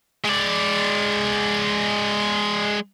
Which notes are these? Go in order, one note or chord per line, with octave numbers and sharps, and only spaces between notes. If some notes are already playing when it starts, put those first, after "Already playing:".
G#3 D5